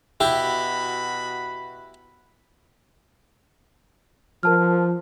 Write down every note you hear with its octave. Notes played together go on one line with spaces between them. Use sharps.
B2 E4 F#4 G4 B5
F3 A#4 A5 F6